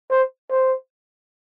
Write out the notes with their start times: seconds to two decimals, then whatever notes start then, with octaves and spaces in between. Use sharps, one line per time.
0.10 C5
0.50 C5